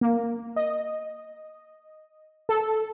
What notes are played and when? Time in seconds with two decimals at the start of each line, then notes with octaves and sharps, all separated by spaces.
0.01 A#3
0.56 D#5
2.49 A4